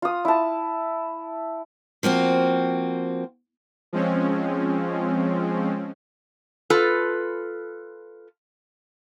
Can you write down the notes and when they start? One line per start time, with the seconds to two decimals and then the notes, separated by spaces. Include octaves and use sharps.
0.02 F4 D#6
0.25 E4 A5
2.03 F3 A#3 C4 F#4
3.93 F3 G#3 C4 C#4
6.70 F4 A4 B4